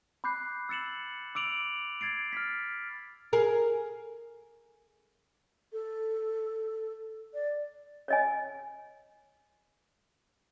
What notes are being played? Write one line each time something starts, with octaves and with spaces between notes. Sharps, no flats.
B5 D6 F#6 G6 C7
E6 A6 C#7 E7 F#7
D6 E6 D7 F7 F#7
G#6 A6 C7 D7
F6 A6 B6
G#4 A#4
A4
D5
C#5 D#5 G#5